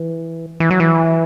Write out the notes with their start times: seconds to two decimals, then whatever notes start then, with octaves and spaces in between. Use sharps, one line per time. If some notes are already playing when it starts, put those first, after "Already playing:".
Already playing: E3
0.60 E3
0.70 F#3
0.80 E3